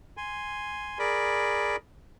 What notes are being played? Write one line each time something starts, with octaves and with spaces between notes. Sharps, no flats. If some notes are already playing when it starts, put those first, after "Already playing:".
G#5 C6
G#4 A#4 D5 B5